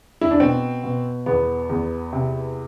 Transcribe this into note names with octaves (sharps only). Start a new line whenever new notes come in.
E4
D4
B2 C4
B2
E2 B3
E2
C3